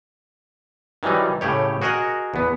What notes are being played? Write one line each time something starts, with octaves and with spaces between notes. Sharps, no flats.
D#3 E3 F#3 G3 D#4
A2 C#3 G4 C#5
F#4 G#4 A#4 D#5 F#5
E2 B3